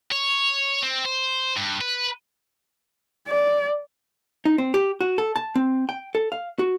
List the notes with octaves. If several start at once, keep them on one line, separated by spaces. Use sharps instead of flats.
C#5
C4
C5
G2
B4
D5
D#4
C4
G4
F#4
A4
A5
C4
G5
A4
F5
F#4